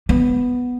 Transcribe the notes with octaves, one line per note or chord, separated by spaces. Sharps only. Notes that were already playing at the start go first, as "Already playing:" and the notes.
B3